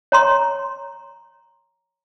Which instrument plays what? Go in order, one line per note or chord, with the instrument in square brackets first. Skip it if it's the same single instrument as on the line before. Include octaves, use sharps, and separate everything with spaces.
[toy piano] C#5 A#5 C6